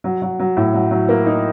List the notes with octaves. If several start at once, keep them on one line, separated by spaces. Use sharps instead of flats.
F#3
F#3
F#3
A2
F#3
F#3
A#3
D#4